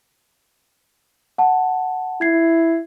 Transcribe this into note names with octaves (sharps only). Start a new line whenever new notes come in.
F#5 A5
E4 G#6 C7